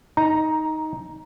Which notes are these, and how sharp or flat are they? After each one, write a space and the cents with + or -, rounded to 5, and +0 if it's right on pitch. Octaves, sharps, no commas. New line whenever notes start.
D#4 +10 A#5 +0